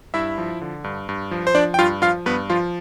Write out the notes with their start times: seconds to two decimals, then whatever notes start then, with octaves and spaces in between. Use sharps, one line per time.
0.14 G2 E4 E5
0.38 F3
0.61 D3
0.84 G2
1.09 G2
1.31 F3
1.47 C5
1.55 F3 D4 D5
1.74 G5
1.79 G2 F4 F5
2.02 F3 F4 F5
2.26 G2 B3 B4
2.50 F3 F4